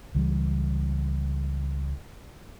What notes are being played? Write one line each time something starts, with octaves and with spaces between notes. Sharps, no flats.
C#2 E3 G3